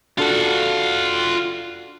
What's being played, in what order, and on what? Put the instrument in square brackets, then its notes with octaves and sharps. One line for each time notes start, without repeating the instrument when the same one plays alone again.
[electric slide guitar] D4 F#4 A4 [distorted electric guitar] F4 F#5